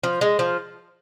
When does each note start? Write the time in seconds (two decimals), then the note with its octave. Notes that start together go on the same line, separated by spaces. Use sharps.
0.03 F3
0.21 G#3
0.39 F3